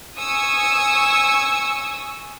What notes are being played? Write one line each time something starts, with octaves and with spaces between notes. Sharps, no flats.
G#5 C#6 D#6 E6